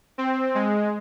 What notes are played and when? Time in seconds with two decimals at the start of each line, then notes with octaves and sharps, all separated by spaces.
0.18 C4
0.55 G#3